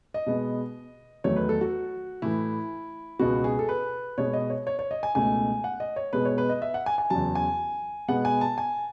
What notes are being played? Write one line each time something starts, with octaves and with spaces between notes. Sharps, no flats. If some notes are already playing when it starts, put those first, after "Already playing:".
D#5
B2 G#3 B3
E2 D#3 F#3 A3 C#5
B4
A4
F#4
A2 E3 A3 E4
C#2 B2 G#3 B3 F#4
G#4
A4
B4
B2 G#3 B3 C#5
D#5
C#5
C#5
C#5
D#5
G#5
C#2 B2 A3 G#5
F#5
D#5
C#5
B2 G#3 B3 B4
C#5
B4
D#5
E5
F#5
G#5
G#5
E2 C#3 F#3 A5
G#5
B2 G#3 B3 F#5
G#5
A5
G#5